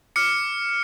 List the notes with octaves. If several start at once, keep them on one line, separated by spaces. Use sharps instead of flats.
D6 F6 C#7